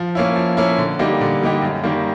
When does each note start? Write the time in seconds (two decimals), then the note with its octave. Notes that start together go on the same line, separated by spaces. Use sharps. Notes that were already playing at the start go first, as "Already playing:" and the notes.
Already playing: F3
0.15 A#3 C#4 E4
0.36 F3
0.57 A#3 C#4 E4
0.78 D3
0.99 G3 A#3 D#4 G4
1.21 D3
1.42 G3 A#3 D#4 G4
1.62 F#2
1.84 D#3 G3 A#3